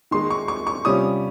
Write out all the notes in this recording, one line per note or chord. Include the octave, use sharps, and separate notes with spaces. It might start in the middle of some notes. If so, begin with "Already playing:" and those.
D#3 G#3 D#4 C6
C#6
C#6
C#6
C3 G3 C#4 F4 D#6